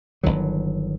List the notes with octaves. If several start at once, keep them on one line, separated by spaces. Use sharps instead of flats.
G1 C#2 D#3 F#3